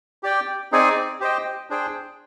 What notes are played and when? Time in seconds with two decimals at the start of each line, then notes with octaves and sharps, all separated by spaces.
0.23 G4 D5 G5
0.72 C4 D#4 G#4 D5 G#5
1.20 G4 C5 D#5 G5
1.70 D4 G#4 C5 G5